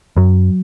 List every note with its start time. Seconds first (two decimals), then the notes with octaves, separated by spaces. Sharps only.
0.17 F#2 F#3